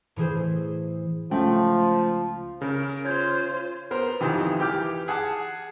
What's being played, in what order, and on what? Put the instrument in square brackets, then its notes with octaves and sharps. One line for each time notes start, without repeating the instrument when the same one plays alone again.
[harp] A2 E3 G#4 C5
[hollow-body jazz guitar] C#2 C#4 G5 [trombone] F3 [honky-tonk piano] A3
[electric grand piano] C#3 [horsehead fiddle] A#4
[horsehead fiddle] F4 C5 [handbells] C#5 G6 G#6
[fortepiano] B3 A#4 C5
F2 C3 D#3 E3
E3 G4 G5 D6 F6
G#4 F#5 A5